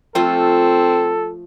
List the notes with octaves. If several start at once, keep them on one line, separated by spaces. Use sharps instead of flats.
F3 A3 C4 F4 A4